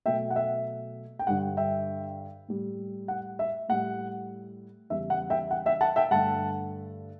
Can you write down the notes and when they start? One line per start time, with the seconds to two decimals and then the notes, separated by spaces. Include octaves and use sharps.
0.06 B2 F#3 A3 E5 G5
0.30 F#5
0.36 E5
1.19 G5
1.27 G2 D3 G3 F#5
1.57 E5 G5
2.48 A2 G3
3.08 F#5
3.39 E5
3.69 A2 G3 F#5
4.90 E2 C#3 E3 G3 E5
5.10 F#5
5.30 E5 G5
5.51 F#5
5.66 E5 G5
5.81 F#5 A5
5.96 E5 G5
6.11 G2 D3 A3 F#5 A5